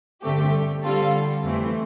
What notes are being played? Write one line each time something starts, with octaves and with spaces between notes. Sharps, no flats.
G2 D3 A3 C4 G4
D3 G3 C4 F4 A4
F2 E3 A3 C4